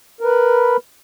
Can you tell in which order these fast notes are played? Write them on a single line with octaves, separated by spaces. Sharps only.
A#4 B4 B5